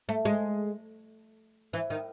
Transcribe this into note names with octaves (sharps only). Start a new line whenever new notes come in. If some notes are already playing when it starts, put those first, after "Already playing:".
A3
G#3
E3
D#3